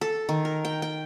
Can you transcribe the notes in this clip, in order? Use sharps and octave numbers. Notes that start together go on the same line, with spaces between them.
A4
D#3
A#4
G5
G5